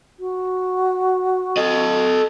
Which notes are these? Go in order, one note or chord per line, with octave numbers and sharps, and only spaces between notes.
F#4
A4 D#5